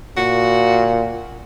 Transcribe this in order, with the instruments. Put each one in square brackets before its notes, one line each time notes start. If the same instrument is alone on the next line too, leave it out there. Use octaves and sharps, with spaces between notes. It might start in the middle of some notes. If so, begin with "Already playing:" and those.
[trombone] A#2 [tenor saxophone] F#4